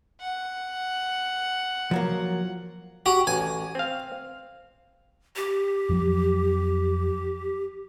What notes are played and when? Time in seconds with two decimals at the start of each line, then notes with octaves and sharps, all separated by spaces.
0.21 F#5
1.91 F3 F#3 A#3
3.06 F#4 G4
3.27 A1 G#5
3.75 C4 F5
5.36 G4
5.89 F2 F3 F#3